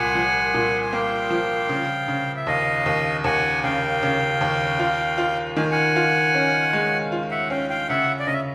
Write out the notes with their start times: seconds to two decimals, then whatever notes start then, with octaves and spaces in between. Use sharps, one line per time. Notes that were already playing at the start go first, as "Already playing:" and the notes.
Already playing: C2 A#2 F#5 G#5
0.15 F3
0.54 A#2
0.81 G#5
0.92 A#3 F5 G5
1.30 F3
1.69 C#3
2.08 C#3
2.36 E5
2.47 D#2 D#5 F5
2.86 D#2
3.24 D#2 F#5 G#5
3.63 C#3 F5 G5
4.03 C#3
4.41 D#2
4.79 F4
5.18 F4
5.57 D#3 G#5
5.71 F#5 G#5
5.96 F4
6.34 C#4
6.73 G#3
7.12 F4
7.31 E5 F#5
7.50 C#4 F5 G5
7.70 F5 G5
7.89 C#3 E5 F#5
8.19 D5
8.27 C#3 D#5
8.33 E5